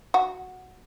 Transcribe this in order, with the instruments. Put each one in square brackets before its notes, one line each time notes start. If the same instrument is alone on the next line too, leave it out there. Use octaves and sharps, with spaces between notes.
[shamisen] F#4